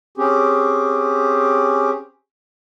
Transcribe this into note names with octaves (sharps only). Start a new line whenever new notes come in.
C4 C#4 G4 G#4